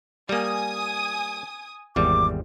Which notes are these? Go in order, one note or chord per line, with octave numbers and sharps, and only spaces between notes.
G3 A#3 G#5 D#6
G#1 E2 G3 D6